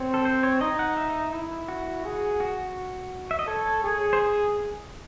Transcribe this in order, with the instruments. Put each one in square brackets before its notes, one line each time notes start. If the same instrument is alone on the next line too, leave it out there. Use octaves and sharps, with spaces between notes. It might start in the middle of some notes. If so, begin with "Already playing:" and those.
Already playing: [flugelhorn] C4 [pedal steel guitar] C#5
[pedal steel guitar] A4
C5
C#5
[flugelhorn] D#4 [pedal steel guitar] D#5
[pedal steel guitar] F#5
E5
[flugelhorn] E4
[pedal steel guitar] F#4
[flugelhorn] G#4
[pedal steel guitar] F#4
E5
D#5
[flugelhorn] A4 [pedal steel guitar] C#5
[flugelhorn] G#4
[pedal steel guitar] C5